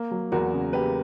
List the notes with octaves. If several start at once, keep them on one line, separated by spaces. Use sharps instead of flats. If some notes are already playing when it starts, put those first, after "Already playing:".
Already playing: A#3
F#3
E2 F#4 A#4
C#3
A#3 G4 B4